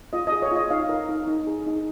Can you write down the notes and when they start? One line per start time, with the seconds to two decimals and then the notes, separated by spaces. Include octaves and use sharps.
0.13 F4 D#5
0.27 D#5
0.32 G#4
0.42 C#5
0.52 F4 D#5
0.70 D#4 F5
0.89 A#4
1.09 D#4
1.28 D#4
1.47 G#4
1.66 D#4